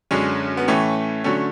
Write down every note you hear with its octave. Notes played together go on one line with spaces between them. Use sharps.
F#2 D3 G#3 C#4
B3
A2 E3 A3 C#4
D3 F#3 A3 C#4